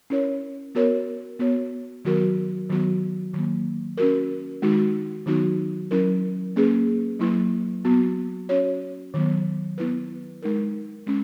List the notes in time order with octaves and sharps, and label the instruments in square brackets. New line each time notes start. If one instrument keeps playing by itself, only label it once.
[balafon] C#4 E4 A#4 C#5
B3 F#4 A#4 C#5
B3 F#4 C#5
D#3 F#3 B3 F#4 A#4
D#3 F#3 B3 F#4
D#3 F#3 A#3
C#4 F#4 A#4
D#3 G#3 D#4 F#4
D#3 F#3 B3 D#4 F#4
F#3 C#4 E4 A#4
A#3 C#4 G#4 B4
F#3 A#3 E4 B4
F#3 B3 F#4
C#4 F#4 C#5
D#3 F#3 B3
B3 E4 B4
G#3 D#4 A#4
G#3 C#4